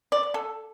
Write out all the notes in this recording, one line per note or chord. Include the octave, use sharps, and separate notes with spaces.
D5
D5
A4